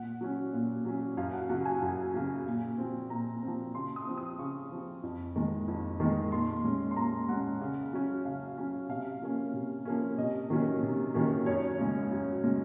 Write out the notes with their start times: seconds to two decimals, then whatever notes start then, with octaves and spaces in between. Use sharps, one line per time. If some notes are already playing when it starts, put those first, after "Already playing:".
Already playing: A#2 F#5
0.21 F#3 C#4
0.53 A#2
0.85 F#3 C#4
1.17 F#2 F5
1.33 F#5
1.49 C#3 F#3 F#5
1.65 G#5
1.82 F#2
2.14 C#3 F#3
2.46 A#2
2.78 F3 C4
3.10 A#2 A#5
3.43 F3 C4
3.75 C#3 C6
3.96 D#6
4.07 F3 C4
4.18 D#6
4.39 C#3 C#6
4.71 F3 C4
5.03 F2
5.36 D#3 G#3
5.68 F2
6.00 D#3 G#3
6.32 A#2 C6
6.64 G#3 C#4
6.91 C6
6.96 A#2 A#5
7.29 G#3 C#4 F#5
7.61 C#3
7.93 F#3 C#4
8.25 C#3 F5
8.58 F#3 C#4
8.89 C3 F5
9.21 F3 A#3 C#4
9.54 C3
9.85 F3 A#3 C#4
10.18 C3 D#5
10.50 D#3 F#3 A#3 C#4
10.83 C3
11.14 D#3 F#3 A#3 C#4
11.46 F#2 C#5
11.79 C#3 G#3 C#4
12.11 F#2
12.44 C#3 G#3 C#4